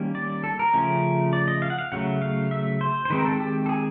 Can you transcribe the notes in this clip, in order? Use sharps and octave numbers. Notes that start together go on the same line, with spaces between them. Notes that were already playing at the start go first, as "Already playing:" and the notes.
Already playing: D#3 G3 A#3 C#4
D5
A4
A#4
C#3 F3 A3 C#4
D5
D#5
F5
F#5
F5
C#3 F#3 A3 F#5
F5
E5
C5
C5
D#3 G#3 C4 B4
A#4
A4
G4
A4
G#4